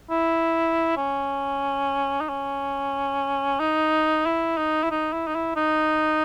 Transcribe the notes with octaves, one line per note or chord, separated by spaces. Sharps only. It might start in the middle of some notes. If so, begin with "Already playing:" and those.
E4
C#4
D#4
C#4
D#4
E4
D#4
E4
D#4
E4
D#4
E4
D#4